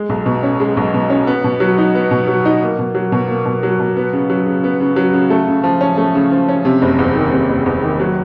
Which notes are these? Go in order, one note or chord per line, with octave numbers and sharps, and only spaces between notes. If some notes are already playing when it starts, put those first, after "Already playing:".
Already playing: G#3
B1
B2
C#4
G#3
B1
B2
C#4
B3
B2
F#3
D#4
B3
B2
F#3
D#4
A#3
B2
F#3
B2
A#3
B2
F#3
B2
B3
C#3
F#3
C#3
B3
C#3
F#3
C#3
A3
C#3
F3
C#4
A3
C#3
F3
C#4
C3
F#1
E2
D#3
C3
F#1
E2
D#3
F#3